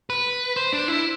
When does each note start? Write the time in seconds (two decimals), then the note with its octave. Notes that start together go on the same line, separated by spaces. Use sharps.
0.10 B4
0.56 C5
0.73 D4
0.88 E4